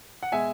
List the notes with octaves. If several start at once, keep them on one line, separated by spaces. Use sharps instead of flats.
F#5
B2 G#3 E5 G#5